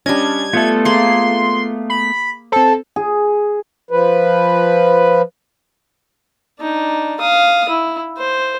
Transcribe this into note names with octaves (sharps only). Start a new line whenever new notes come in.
G3 C#4 D4 D#5 A5 G#6
A3 B3 F4 A4 E5
A#3 G#4 C6
B5
C4 A4 C5
G#4
F3 B4
D4 D#4
F5 D#6
E4
C5